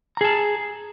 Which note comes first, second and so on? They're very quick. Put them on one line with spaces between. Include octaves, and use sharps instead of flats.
A#5 G#4 A5